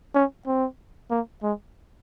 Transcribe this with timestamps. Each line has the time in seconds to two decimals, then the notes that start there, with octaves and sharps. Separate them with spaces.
0.15 C#4
0.47 C4
1.11 A#3
1.43 G#3